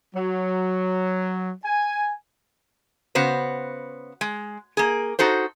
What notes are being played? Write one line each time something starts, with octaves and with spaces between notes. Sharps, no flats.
F#3
G#5
C#3 B3 F#4 C5
G#3
A#3 G#4
D#4 F#4 A4 C5